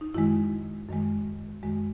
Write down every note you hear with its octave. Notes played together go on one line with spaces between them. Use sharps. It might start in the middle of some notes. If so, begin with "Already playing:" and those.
D#4
F#2 D#3 G#3 E4
F#2 D#3 G#3
F#2 D#3 G#3